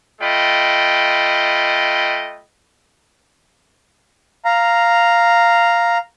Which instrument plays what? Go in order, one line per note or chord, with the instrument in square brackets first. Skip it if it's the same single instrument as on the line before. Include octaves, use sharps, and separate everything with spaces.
[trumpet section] A3 F4 D#5 G5 B5
[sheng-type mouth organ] F5 A#5